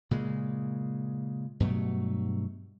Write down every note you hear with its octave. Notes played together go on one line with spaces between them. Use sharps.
A#2 C#3 G#3
G2 B2 F#3 A3